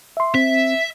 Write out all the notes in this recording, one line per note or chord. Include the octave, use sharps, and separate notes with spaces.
E5 C6
C4 E5